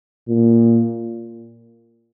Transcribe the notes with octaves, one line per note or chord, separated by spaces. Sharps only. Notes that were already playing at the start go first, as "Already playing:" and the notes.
A#2